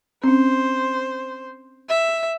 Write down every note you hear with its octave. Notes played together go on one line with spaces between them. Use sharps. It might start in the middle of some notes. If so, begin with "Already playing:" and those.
C4 C#4 C5
E5